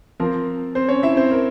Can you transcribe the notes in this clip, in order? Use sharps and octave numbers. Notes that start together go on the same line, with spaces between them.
F3 C4 A#4
C4 C5
C#4 C#5
E4 E5
C4 C5
A#4